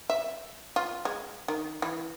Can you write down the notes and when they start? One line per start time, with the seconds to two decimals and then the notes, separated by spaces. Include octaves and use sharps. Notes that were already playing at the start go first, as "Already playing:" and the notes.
0.10 E5
0.76 F4
1.05 G#3
1.48 D#3
1.82 E3